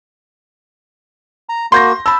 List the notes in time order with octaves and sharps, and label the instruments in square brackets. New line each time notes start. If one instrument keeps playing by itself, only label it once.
[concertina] A#5
[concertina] A#3 F#4 [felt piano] C6 G6 A#6
[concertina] A5 [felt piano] B5 E6